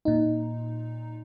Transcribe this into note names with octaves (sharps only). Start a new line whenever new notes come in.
A#2 D#4